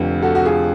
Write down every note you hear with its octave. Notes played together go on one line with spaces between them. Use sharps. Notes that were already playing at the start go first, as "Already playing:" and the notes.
Already playing: F1 F2 D3 F3 B4
F#4 A4
F#4
F4 G#4